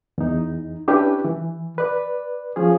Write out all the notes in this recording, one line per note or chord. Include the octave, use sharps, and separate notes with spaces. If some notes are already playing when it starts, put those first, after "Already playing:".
E2 D#4
C#4 D4 E4 G4 B4
E3
B4 D5
F3 C#4 G#4